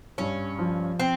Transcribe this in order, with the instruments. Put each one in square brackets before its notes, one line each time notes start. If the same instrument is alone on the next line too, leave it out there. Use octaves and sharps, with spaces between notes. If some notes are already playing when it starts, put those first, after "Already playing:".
[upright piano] G2 [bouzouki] C#4
[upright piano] F3
[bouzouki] C4